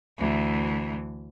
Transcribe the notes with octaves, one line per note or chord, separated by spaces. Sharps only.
D2 E3